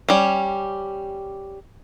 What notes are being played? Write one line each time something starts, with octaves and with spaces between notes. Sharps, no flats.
G3 C#4